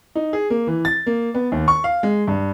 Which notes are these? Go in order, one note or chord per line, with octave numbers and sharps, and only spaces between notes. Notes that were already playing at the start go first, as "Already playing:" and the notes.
D#4
G#4
A#3
E3
A6
A#3
B3
D#2
C#6
F5
G#3
G2